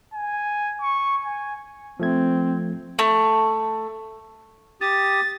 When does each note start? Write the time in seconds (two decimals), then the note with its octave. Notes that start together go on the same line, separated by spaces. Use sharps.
0.14 G#5
0.82 C#6
1.25 G#5
2.00 F3 A3 C4 G#6
2.99 A3
4.81 G4 D#6 A6